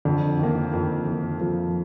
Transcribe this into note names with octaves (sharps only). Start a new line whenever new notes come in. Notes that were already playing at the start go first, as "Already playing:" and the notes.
F2 D3
D#3 A#3
F2
D#3 A#3
F2 F3